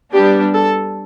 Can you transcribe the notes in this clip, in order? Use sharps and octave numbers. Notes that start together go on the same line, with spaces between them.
G3 B3 D4 G4
A4